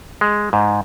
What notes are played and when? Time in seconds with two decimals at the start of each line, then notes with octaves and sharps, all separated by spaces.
0.21 G#3
0.53 G#2